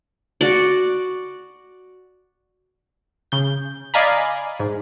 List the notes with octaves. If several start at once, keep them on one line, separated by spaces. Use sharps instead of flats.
F#4 D5
C#3 G6
D5 D#5 F5 G#5 A#5 B5
G#2